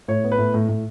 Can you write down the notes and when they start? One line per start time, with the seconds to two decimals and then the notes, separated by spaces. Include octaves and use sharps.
0.08 A2 C#5
0.24 B3
0.32 B4
0.38 A2
0.54 A2
0.69 A2